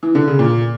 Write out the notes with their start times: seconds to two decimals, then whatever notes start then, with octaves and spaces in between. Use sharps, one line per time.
0.03 E3
0.15 D3
0.28 C#3
0.39 A#2